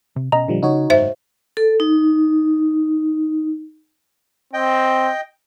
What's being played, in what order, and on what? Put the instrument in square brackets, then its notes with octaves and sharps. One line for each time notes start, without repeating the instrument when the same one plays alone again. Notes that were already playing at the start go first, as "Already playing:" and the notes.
[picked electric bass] C3
[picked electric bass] B2 C#4 [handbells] D#5 A#5
[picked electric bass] A#2 [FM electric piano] D3 F3 G3
[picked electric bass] C#3 [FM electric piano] D#4 F#4 C#5
[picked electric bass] F#1 G#2 [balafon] C5 E5
[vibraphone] A4
D#4
[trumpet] C4 [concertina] D#5 G5